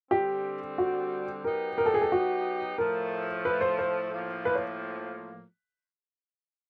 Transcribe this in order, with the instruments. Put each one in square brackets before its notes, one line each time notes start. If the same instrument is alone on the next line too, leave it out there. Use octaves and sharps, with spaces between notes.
[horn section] D3 G3 C4 [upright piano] G4
[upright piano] F#4
[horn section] F#3 B3 D#4 G4 [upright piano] A#4
[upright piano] A#4
A4
G#4
A4
F#4
[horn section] A2 F3 A3 [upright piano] A#4
[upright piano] B4
C5
C5
[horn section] A2 F3 A#3
[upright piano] B4
C#5